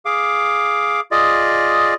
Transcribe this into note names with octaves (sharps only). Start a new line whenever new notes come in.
G#4 F5 D6
F4 G#4 D5 D#5